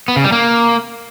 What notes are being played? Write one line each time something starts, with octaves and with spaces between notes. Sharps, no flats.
B3
C#3
G3
A#3